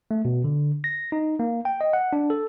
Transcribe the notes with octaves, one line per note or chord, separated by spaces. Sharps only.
A3
B2
D3
A#6
D#4
A#3
G5
D#5
F#5
D4
A4